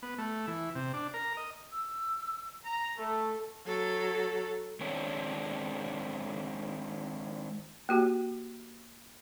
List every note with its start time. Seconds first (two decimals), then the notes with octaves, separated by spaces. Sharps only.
0.03 B3
0.18 A3
0.48 E3
0.75 C3
0.93 D4
1.14 A#4
1.37 D#5
1.72 E6
2.65 A#5
2.98 A3 A4
3.66 F#3 A4
4.80 D#3 G#3 C4 D4 A#4 C#5
7.89 A#3 F#4 G4